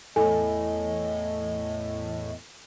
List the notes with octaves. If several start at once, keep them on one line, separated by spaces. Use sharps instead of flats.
E2 A2 A4 D#5 G#5